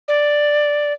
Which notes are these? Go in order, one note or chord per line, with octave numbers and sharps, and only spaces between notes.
D5